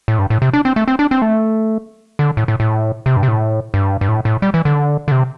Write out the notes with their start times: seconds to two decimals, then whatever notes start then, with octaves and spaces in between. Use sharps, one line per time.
0.08 A2
0.19 G2
0.30 A2
0.42 C3
0.53 D4
0.65 C4
0.76 A3
0.88 C4
0.99 D4
1.11 C4
1.22 A3
2.19 D3
2.37 A2
2.48 A2
2.60 A2
3.06 C3
3.17 G2
3.23 C3
3.28 A2
3.74 G2
4.01 G2
4.09 A2
4.25 A2
4.42 G3
4.54 E3
4.65 D3
5.08 D3
5.12 C3